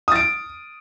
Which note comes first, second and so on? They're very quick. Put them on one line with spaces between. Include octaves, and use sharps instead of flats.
D#6 A6 D7